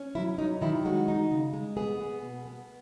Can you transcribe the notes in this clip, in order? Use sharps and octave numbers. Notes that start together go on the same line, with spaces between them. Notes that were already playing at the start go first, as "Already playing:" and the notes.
Already playing: C#4
F#3 E4
F#3 D#4
D#3 E4
G#3 F#4
D#4
C#3
G#3
B3 G#4
B3
B2
B3